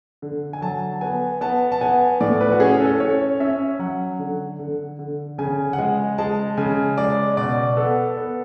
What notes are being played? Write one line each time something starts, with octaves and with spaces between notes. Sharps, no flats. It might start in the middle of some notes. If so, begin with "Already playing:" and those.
D3
G#5
F#3 A5
B3 G#5
B3 A5
A5
B3 G#5
A2 D5
B4
F#4
C#4 G#4
A4
C#4 C#5
C#4 E5
F#3 F#5
D3
D3
D3
C#3 G#5
F#5
G#3 G#5
G#3 A5
C#3 G#5
G#3 D5
B2 D5
B3 A4
B3